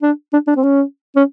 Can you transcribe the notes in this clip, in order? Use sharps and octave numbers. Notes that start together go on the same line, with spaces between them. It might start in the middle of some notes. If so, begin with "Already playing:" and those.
D4
D4
D4
C4
C#4
C#4